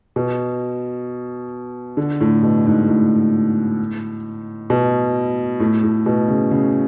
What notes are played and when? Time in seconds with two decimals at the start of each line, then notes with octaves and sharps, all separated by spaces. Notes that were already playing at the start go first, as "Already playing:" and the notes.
0.16 B2
1.97 D3
2.21 A2
2.43 B2
2.66 G#2
2.88 A2
4.70 B2
5.60 A2
5.83 A2
6.06 B2
6.28 C#3
6.51 C#3